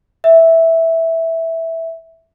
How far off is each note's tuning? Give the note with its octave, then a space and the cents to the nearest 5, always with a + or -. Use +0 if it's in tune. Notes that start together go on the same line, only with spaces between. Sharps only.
E5 -5